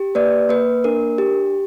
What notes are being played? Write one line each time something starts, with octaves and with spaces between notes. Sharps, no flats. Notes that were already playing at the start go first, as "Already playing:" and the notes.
Already playing: G4
A#3 B4 D5
A#3 B4
D4 A#4
G4